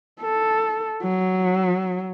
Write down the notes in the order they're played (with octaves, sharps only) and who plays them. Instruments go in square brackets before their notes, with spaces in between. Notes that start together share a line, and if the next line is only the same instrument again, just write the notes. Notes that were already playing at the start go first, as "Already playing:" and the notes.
[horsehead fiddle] A4
F#3